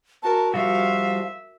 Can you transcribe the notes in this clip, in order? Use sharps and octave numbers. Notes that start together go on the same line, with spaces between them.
F#4 A#4 A5
F3 G3 F#4 E5 F5